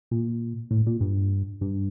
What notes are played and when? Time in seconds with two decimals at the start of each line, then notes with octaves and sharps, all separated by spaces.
0.11 A#2
0.71 A2
0.86 A#2
1.01 G2
1.61 G2